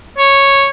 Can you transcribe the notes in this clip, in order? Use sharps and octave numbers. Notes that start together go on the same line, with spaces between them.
C#5